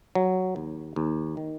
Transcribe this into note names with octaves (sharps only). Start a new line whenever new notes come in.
F#3
D#2
D#2
D#3